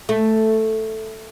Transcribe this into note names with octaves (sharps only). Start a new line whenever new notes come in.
A3